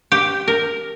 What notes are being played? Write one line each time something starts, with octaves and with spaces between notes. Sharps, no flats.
G4
A#4